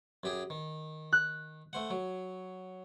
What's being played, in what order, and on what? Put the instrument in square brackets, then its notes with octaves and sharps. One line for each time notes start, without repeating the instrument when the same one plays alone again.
[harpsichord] F#2 G4 G#4
D#3
[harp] F#6
[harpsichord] A3 C5 F#5
F#3